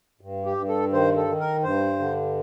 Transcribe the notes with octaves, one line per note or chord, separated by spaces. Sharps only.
G2
G4
G2
A4
D#3 C5
A4
D#3
A#4
G2 C5
D3